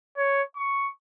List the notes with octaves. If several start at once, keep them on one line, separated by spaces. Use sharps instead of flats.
C#5
C#6